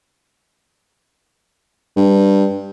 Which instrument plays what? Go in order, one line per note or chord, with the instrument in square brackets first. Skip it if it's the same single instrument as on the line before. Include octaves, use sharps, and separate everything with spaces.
[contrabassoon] G2